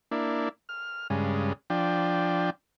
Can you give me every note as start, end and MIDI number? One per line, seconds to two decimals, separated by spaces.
0.11 0.49 58
0.11 0.49 62
0.11 0.49 64
0.69 1.07 89
1.10 1.53 43
1.10 1.53 49
1.10 1.53 56
1.70 2.50 53
1.70 2.50 62
1.70 2.50 79